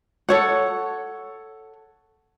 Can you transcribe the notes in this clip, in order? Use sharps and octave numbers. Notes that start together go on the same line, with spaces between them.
A4 C#5 F#5